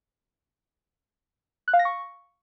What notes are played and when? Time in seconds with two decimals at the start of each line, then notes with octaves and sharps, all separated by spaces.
1.68 F#6
1.73 F5
1.79 A#6
1.85 C#6